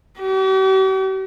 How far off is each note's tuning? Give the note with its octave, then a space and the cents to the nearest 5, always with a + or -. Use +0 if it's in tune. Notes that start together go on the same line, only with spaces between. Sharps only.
G4 -45